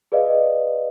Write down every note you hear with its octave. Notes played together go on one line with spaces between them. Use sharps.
G#4 B4 D5 D#5 F5